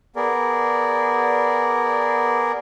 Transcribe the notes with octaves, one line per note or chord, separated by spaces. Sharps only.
B3 G#4 A#4 D5